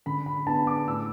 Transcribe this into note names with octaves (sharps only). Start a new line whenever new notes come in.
D3 B5
B5
B3 D4 A5
D6
A2 E6